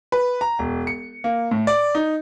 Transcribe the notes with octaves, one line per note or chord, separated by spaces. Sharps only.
B4
A#5
E1
C#7
A#3
A2
D5
D#4